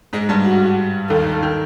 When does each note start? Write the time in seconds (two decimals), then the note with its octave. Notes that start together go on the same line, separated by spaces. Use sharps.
0.13 G#2 G#3
0.29 G2 G3
0.45 F#4
1.10 D#2 D#3 A4
1.42 D#3